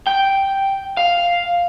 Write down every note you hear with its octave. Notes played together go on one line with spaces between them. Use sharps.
G5
F5